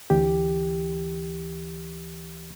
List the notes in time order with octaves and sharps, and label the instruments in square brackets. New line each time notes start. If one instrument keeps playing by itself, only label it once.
[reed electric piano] D2 E3 G4